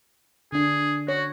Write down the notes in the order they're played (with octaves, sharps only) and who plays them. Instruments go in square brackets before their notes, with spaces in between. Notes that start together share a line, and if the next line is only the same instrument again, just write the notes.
[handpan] D3 D4 [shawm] G#4
[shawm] F#4 [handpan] C#5